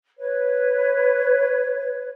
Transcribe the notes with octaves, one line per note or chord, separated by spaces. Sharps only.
B4 C#5